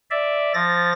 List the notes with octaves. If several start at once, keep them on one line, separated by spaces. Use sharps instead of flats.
D5 E5
F3 A6 A#6